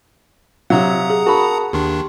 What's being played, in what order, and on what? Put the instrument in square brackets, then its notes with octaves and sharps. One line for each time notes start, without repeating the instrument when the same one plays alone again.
[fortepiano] C3 F#3 [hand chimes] F5 [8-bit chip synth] F#5 A#5 D#6
[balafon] G#4
[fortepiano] F#4 B5 [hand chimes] A#4 A5
[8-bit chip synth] D#2 D#3 D4 [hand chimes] G4 C6